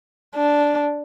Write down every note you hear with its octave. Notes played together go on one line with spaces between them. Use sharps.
D4